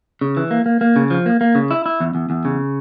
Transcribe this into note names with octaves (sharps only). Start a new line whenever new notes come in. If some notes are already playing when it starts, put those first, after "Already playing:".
C#3
E3
A#3
A#3
A#3
C#3
F3
A#3
A#3
C#3
E4
E4
E2
E2
E2
C#3